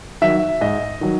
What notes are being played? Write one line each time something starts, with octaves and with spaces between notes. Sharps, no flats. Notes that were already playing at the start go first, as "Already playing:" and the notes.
D#3 F#3 E5
G#2 D#5
D#3 F#3